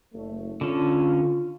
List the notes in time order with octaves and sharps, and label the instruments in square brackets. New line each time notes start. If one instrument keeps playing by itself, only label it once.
[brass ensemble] F#1 A3
[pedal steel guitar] D3 C#4 [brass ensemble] F4